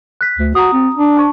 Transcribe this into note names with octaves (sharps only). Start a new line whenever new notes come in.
F#6 B6
D2
F#4 A#5 D#6
C4
D4
A5 C#6